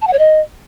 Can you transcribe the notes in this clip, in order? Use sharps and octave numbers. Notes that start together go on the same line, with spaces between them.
A5
F#5
C#5
D#5